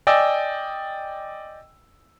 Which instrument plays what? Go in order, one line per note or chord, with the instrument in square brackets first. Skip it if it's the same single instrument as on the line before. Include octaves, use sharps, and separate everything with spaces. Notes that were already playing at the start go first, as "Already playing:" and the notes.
[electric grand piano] D5 D#5 G5 G#5 E6